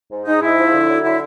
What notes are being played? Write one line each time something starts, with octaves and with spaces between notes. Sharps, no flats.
G#2
G#3 D#4
G#2 E4
F3
D3
F#3
D3 E4